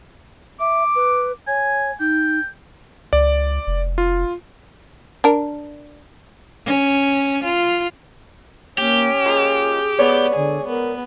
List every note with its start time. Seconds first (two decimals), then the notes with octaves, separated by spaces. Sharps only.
0.60 E5 D6
0.95 B4
1.47 C#5 G#5
2.00 D#4 G5
3.13 C#2 D5
3.67 F1
3.98 F4
5.24 D4 A#4
6.66 C#4
7.44 F4
8.78 A#3 C#4 G4
9.25 A#3 F4 G#4 D#5
9.99 G#3 B3 C#5 D5
10.36 D3 G#4
10.68 B3 A#4